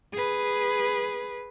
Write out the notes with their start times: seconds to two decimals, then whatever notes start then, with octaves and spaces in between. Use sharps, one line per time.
0.13 G#4 B4